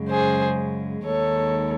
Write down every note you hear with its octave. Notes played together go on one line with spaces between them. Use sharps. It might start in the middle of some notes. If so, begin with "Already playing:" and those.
Already playing: F#2 C#3 G#3
G#4 C5
D#2 D#3 G#3 A4 C#5